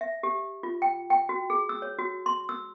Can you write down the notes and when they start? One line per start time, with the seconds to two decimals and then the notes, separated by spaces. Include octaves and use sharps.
0.01 E5
0.23 G4
0.63 F4
0.82 G5
1.10 G5
1.29 F#4
1.50 G#4
1.69 E6
1.82 C#5
1.99 F#4
2.26 C6
2.49 E6